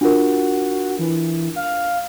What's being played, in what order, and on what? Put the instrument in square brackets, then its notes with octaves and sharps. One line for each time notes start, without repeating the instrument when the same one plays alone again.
[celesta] D4 F4 A#4 [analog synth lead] F#4
[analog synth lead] E3
F5